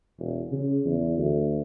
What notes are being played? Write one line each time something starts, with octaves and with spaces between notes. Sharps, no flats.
E1
C#3
E2
D2